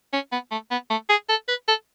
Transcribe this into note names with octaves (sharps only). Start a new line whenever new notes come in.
C#4
B3
A3
B3
A3
G#4
A4
B4
A4